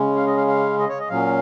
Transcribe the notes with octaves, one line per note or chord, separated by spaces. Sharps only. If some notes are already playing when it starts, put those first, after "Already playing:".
Already playing: C#3 G#3 C#4
F5
D#5
F5
F5
D#5
C#5
D#5
A#2 F#3 C#4 F5